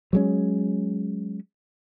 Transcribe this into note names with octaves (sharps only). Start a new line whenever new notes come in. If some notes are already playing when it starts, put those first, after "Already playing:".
F#3 G#3 C#4